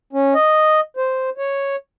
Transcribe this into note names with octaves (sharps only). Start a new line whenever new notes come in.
C#4
D#5
C5
C#5